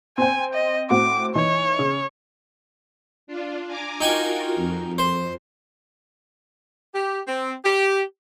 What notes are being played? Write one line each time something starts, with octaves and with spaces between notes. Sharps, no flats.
C4 C5 G5 G#5
D#5
A2 C4 F#4 D6
E3 D#4 C#5
C#3
D4 F4
G#5 A#5 D6
D#4 F4 F#4 A#4 G5 G#5
F2
C5
G4
C4
G4